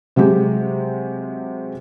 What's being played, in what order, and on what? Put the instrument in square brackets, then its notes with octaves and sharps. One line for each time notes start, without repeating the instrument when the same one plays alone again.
[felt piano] C3 F#3 G#3 G4